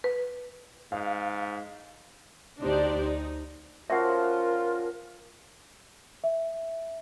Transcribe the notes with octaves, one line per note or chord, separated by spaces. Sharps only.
B4
G#2 F5
D2 D4 D#4 G4 C5 D5
D#4
F3 C#4 F4 F#4 A#4 E5 F#5
E5